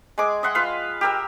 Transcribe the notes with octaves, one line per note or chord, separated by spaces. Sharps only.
G#3 G#4 G#5 D6
D#5 E5 F#5 C6
F4 B4 F5
G4 A#4 E6